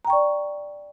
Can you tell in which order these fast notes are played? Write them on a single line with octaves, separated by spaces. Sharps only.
A#5 G5 C#6 D5